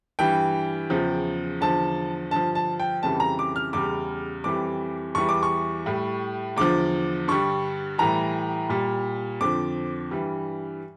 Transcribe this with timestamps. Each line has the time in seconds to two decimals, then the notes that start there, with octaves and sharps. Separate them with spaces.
0.19 G2 E3 G3 G5
0.90 E2 C#3 F3
1.61 E2 D3 F3 A5
2.31 G2 D3 F3 A5
2.55 A5
2.80 G5
3.03 F2 C#3 E3 G3 A5
3.20 A#5
3.39 D6
3.56 F6
3.73 E2 C#3 G3 D6
4.44 F2 E3 G3 D6
5.15 E2 E3 G3 C#6
5.29 D6
5.43 C#6
5.86 A2 G3
6.57 E2 D3 F3 D6
7.28 G2 D3 G3 C#6
7.98 A2 E3 G3 A#5
8.69 A#2 G3
9.40 F2 D3 F3 D6
10.11 G2 E3 G3